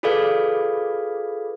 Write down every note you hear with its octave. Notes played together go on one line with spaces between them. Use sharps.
F4 G#4 A4 B4 D5 F5